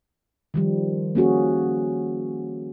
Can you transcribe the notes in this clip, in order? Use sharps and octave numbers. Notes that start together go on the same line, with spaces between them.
D#3 F3 G3
A#3 C#4 F#4 G#4